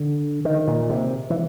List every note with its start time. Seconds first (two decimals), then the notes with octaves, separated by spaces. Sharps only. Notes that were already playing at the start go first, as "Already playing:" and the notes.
Already playing: D3
0.45 D#3
0.67 A#2
0.90 C3
1.30 E3